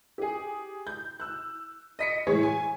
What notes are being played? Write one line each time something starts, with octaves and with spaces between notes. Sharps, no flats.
G4 G#4
G6
E6 F#6
D#5 B6 C#7
A2 E3 G#3 C#5
G#5